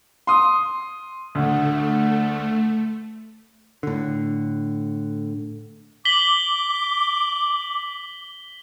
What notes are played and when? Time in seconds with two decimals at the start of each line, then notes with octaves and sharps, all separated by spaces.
0.27 C6 D#6
1.35 D2 A3
3.83 A2 D3
6.05 D6 B6 F#7 G7